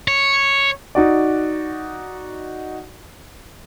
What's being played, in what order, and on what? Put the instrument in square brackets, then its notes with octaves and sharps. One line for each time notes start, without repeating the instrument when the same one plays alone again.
[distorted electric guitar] C#5
[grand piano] D#4 F#4 D5